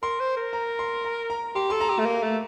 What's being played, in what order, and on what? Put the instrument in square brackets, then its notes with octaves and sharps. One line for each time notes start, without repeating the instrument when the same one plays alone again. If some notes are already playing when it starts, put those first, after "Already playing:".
[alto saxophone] A#4 [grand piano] C6
[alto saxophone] C5
A#4
[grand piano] A#5
C6
A#5
A#5
[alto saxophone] G4 [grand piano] C6
[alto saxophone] A4 [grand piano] C6
[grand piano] A#5
[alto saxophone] G4
A3
A#3
A3